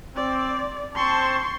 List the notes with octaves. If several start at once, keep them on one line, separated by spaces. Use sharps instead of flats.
C4 D5
C4 C5 A5 C6 C#6